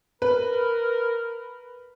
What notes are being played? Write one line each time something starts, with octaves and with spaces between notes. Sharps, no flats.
A#4 B4